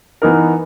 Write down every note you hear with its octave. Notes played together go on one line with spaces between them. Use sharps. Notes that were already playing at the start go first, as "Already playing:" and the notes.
E3 B3 D#4 A#4